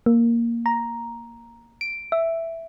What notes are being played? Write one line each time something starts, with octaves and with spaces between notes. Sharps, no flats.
A#3
A#5
D7
E5